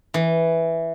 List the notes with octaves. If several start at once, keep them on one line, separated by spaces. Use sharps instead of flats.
E3